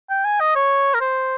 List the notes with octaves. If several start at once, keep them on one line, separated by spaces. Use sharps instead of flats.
G5
G#5
D#5
C#5
A#4
C5